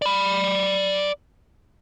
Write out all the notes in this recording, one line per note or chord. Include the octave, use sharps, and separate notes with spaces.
D5 B5